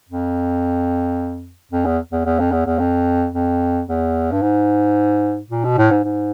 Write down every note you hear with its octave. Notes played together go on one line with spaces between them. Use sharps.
F2
F2
E2
E2
E2
F2
E2
E2
F2
F2
E2
G2
G#2
A#2
B2
A2
G#2
G#2